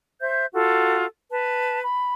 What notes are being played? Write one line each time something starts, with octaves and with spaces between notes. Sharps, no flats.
C5 E5 G6
F4 F#4 A4
B4 A5
B5